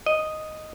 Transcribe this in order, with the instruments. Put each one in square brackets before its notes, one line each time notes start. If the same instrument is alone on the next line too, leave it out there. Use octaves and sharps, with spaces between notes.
[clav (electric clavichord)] D#5